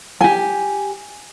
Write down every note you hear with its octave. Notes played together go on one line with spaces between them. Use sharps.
G4 G#5